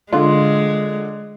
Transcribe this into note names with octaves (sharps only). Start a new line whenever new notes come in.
D3 G#3 F4